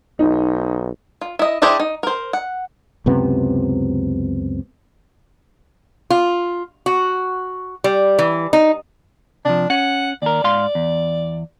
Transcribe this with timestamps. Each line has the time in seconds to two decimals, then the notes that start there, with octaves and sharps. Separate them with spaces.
0.19 B1 D#4
1.21 F4
1.39 E4 D#5
1.62 D4 E4 G4 G#4 C5
1.80 D#4
2.03 A#4 C5
2.33 F#5
3.06 C#2 F#2 C3 B3
6.10 F4
6.86 F#4
7.84 G3
8.19 E3
8.53 D#4
9.45 C3 F3 D4
9.70 C#4 F#5
10.22 D#2 A#4 D5
10.44 G#2 F5 C6
10.75 E2